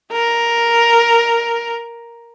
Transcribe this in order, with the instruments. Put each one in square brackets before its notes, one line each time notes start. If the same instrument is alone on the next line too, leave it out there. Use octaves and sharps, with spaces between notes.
[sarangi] A#4